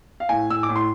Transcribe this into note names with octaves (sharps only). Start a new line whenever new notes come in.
F5
A2 G#5
A2 E6
D6
A2
C6